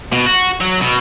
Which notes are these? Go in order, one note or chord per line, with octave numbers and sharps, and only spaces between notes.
B2
F#4
F#3
B2